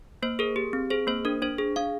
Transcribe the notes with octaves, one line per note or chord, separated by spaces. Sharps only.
A#3 C5
G#4 A#4
G4
C4
G#4 C5
A#3 C5
D4 A#4
D4 C5
G#4
D4 F5